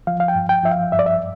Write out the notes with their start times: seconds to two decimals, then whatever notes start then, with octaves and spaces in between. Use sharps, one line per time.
0.07 F3 F5
0.20 F5
0.28 G5
0.35 G2
0.49 G5
0.64 F3 E5
0.71 F5
0.92 G2 E5
0.99 D5
1.06 E5